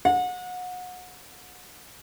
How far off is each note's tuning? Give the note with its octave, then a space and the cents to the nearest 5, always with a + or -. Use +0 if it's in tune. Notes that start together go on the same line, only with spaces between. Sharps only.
F#5 -30